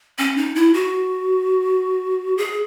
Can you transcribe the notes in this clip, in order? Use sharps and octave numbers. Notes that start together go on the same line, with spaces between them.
C#4
D#4
E4
F#4
G#4